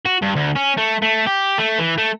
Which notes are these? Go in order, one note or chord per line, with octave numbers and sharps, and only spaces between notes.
F#4
G2
D2
C#4
A3
A3
G4
A3
E3
A3